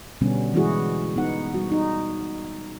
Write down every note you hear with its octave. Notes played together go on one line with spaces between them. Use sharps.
B2 D3 G3 B3 C#4
E3 G#3 E4 F#4 G#4
B3 D#4 F#5
G3 F#4
D#4